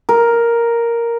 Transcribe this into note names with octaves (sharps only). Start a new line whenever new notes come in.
A#4